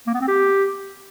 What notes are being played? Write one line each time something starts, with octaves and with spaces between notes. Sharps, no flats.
A#3
B3
C4
G4